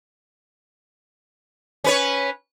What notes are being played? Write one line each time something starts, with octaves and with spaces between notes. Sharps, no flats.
C#4 B4 C#5